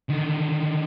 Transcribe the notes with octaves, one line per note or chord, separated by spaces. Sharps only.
D3 D#3